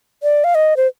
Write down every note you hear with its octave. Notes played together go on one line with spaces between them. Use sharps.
D5
F5
D#5
C5